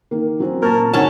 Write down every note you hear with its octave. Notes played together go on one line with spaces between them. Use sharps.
D#3 A#3
F#3 C4 C#4
A#2 A#4 A5 C#6
G#2 D3 F#3 C4 C#4 F#5 A5